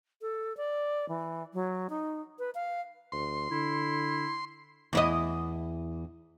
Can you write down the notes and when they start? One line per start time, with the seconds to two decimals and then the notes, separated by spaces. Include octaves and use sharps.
0.22 A4
0.57 D5
1.09 E3
1.54 F#3
1.90 D#4
2.39 B4
2.55 F5
3.12 D2 C6
3.51 D3 E4
4.93 E2 E4 D#5